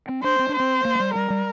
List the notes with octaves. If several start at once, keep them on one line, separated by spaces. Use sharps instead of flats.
C4
D4 C5
C4
D4
C5
C4
A#3
G#3
G3
G3 A#4
G3